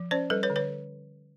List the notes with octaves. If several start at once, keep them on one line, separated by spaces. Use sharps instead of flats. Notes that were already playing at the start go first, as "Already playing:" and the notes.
Already playing: F3
C#4 C5 D5
G3 A4 B4
B4 C#5
D3
B4 C#5